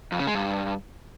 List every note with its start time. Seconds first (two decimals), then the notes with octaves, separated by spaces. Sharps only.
0.12 F2
0.20 C#3
0.27 G#3
0.35 G2